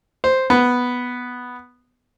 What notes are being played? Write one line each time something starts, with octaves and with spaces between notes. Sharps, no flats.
C5
B3